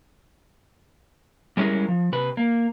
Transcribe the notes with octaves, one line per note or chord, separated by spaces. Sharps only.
G3 G#3 C#4 E4 G#4 A#4
F3
C3 B4
A#3